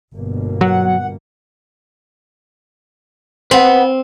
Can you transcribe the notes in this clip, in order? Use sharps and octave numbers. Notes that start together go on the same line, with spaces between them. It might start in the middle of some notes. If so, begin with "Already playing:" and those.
G1 B2 A#3
F#3 F#5
C4 B4 F#5